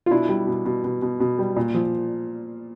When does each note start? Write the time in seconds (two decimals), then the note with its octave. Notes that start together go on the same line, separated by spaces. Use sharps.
0.06 F4
0.11 B2 D4 E4
0.29 G3
0.47 B2
0.65 B2
0.84 B2
1.02 B2
1.20 B2
1.39 G3
1.56 A#2
1.74 F3